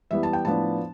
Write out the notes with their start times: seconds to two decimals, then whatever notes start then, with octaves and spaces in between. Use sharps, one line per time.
0.11 E3 G3 B3 E5
0.23 A5
0.33 G5
0.45 A2 F3 B3 D4 A5